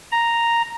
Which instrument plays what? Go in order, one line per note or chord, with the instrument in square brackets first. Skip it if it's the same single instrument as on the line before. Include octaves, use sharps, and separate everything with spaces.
[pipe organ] A#5